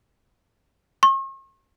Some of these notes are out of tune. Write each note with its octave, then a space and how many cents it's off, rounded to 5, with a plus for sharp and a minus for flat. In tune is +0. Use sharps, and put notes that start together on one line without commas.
C#6 -45